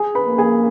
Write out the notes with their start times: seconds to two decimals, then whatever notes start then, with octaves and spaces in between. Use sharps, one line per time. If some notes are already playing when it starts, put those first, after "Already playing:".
Already playing: G#4 G#5
0.15 B4 B5
0.27 A#3
0.38 G#4 G#5